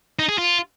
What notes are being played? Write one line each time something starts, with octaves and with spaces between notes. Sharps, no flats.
D#4
G#4
F4